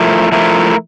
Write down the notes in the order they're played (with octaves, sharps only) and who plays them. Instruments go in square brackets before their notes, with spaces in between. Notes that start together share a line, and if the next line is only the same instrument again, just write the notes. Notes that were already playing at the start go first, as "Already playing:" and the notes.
Already playing: [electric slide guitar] F3 A3 E4 A#4
F3 A3 E4 A#4